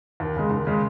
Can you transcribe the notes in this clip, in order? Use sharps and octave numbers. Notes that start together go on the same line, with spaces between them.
D#2
C#3 G#3
D#2
C#3 G#3